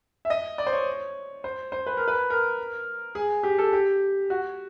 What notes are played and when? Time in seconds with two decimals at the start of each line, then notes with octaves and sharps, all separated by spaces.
0.25 E5
0.30 D#5
0.58 D5
0.67 C5
0.73 C#5
1.44 C5
1.72 C5
1.87 B4
1.97 A#4
2.08 B4
2.30 A#4
3.15 G#4
3.43 G4
3.58 A4
3.73 G4
4.30 F#4